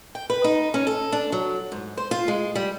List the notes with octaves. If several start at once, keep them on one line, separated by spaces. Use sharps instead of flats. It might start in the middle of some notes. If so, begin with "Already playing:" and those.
G5
B4
D#4
C#4
A4
D4
F#3
G#2
C5
F4
G#3
G3